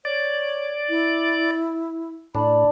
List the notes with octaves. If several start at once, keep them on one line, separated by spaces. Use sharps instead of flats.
C#5 D5
E4
A2 D4 B5